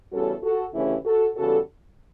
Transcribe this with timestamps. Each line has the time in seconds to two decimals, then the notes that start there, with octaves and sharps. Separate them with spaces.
0.12 E2 C#3 G3 C#4 F#4 A4
0.43 F#4 A4
0.74 D2 C#3 E3 A3 C#4 E4 G4
1.05 F#4 A4
1.36 E2 C#3 G3 F#4 A4